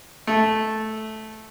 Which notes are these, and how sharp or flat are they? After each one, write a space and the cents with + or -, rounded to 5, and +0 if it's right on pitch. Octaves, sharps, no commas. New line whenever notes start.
A3 -10